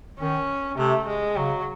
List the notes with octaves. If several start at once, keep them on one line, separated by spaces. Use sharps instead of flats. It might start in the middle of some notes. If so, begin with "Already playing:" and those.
D#3 C#4
C3 A3
G#3
C#3 F#3